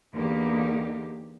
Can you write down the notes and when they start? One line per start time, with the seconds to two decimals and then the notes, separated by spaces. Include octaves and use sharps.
0.14 E2 D3 A#3 D#4 G4